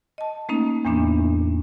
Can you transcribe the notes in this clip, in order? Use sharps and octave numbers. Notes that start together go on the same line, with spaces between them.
D#5 A5
A3 A#3 C#4 D#4
E2 A2 E3 A#3 B3 D4